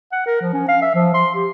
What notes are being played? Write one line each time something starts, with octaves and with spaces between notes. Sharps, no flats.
F#5
A#4
F3
C#4
F5
E5
F3
C6
G4